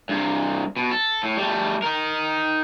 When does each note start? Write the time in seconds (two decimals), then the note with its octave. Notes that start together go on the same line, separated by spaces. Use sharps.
0.09 G2 C3
0.77 B2
0.92 A4
1.23 A2
1.37 G3 A3
1.82 D#4 A#4